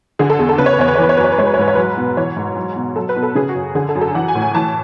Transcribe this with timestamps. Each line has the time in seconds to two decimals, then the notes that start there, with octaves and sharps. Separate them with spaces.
0.19 D3 G#4
0.30 A4
0.39 E2 G#4
0.49 A4
0.58 C#3 B4
0.66 C#5
0.73 B4
0.78 E2 C#5
0.88 B4
0.95 C#5
0.98 E3 B4
1.09 C#5
1.17 F#2 B4
1.24 C#5
1.32 B4
1.38 G#3 C#5
1.46 B4
1.54 C#5
1.58 G#2 B4
1.68 C#5
1.75 F#3 B4
1.97 B2
2.17 E3 C#5
2.36 G#2
2.56 F#3
2.76 B2
2.96 F#3 A4
3.09 B4
3.16 B2
3.23 A4
3.35 C#3 G#4
3.48 F#4
3.55 F#2
3.75 D3 G#4
3.89 A4
3.95 F#2
4.01 A4
4.14 E3 F#5
4.28 G#5
4.35 A2
4.42 G#5
4.54 E3 A5